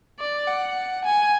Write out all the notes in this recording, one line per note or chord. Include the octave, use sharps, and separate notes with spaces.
D5
F#5
G#5